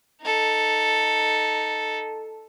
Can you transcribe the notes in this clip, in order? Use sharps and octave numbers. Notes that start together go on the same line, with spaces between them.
D#4 A4